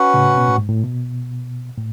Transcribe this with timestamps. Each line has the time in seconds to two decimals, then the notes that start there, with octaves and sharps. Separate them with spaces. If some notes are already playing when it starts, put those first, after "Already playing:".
Already playing: C#4 F#4 B4 F#5
0.14 A2 C#3
0.38 B2
0.48 A2
0.58 G#2
0.69 A2
0.84 B2
1.78 A2